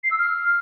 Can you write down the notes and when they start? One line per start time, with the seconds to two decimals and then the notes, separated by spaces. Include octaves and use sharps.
0.04 C7
0.11 E6
0.18 F6